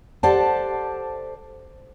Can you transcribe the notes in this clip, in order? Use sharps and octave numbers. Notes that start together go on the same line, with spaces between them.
G4 A4 C5 D5 F#5 A5